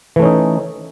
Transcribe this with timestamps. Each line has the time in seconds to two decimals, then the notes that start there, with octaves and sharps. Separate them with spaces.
0.16 E3
0.19 A3
0.22 C#4
0.25 D#4